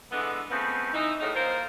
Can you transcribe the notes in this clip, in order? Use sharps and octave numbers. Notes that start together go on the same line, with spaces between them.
D3 E3 G#3 B3
C#3 F3 A3 B3 C4
E3 D#4
A2 C#3 D#4
A#3 F4 A#4 C5